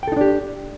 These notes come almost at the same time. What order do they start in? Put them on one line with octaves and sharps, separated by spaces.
G5 A4 D#4 D4 G4